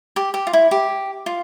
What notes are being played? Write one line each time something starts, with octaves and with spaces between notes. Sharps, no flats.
G4
G4
F4
E4
G4
F4